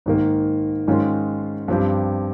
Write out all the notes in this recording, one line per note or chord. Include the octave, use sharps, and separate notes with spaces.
G#2 D#3 A#3
G#2 D#3 G#3 C#4 F4
G2 F3 C4 G4